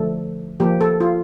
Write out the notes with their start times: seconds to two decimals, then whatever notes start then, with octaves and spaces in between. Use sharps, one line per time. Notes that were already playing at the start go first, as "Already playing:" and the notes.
Already playing: D3 F3 A3 A4
0.60 F3 A#3 G4
0.81 A4
1.00 F4